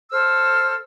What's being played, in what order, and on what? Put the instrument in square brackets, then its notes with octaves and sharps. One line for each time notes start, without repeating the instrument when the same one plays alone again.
[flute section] A4 C5 E6 F6